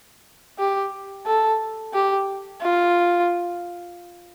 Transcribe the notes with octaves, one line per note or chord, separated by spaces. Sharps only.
G4
A4
G4
F4